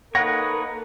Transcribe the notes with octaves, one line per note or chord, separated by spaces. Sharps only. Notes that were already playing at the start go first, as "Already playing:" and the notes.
A#3 D#4 A4 B4 C#5 F#5 A#6